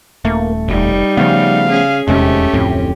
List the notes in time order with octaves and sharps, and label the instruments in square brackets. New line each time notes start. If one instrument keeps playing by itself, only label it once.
[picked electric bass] D#1 A3 [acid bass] A#3
[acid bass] F1 [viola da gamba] G3 D#4
[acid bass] C#3 [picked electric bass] F3 A3 B3 [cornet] F5
[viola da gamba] C#4 G#4
[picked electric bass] D#1 E2 G#3 [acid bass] C3 [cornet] A3 [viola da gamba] C#4 G4
[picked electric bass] D1 F2 C4 [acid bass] A2